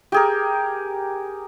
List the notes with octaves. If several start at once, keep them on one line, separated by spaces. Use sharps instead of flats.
G4 G#4 A#4